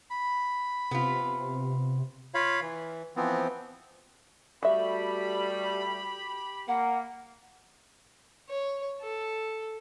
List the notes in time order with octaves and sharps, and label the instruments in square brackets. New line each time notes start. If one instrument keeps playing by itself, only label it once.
[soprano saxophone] B5
[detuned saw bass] C3 [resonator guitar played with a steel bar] B3 F4
[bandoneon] F4 C#5 F5 B5
E3
E3 F3 B3 C4
[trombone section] G3 A3 [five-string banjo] F#4 E5 [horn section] G4 B5
[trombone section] A#3 [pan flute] F#5
[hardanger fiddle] C#5
A4